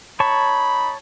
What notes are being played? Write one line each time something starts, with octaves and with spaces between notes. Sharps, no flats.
D#4 C#5 A5 B5 C#6